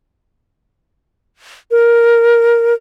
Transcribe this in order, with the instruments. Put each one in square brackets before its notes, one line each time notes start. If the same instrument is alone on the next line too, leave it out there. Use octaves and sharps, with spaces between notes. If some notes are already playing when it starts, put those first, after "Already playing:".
[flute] A#4